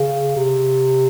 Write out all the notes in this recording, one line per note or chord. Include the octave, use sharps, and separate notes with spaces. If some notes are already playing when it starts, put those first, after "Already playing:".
Already playing: C#3
C3